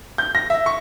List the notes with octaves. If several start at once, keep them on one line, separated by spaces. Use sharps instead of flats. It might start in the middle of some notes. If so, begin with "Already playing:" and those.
G6
A#6
E5
C#6